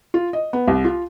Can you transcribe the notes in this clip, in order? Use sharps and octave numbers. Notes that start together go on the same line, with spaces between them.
F4
D#5
B3
C2
F4